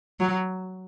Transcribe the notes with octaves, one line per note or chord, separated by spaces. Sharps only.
F#3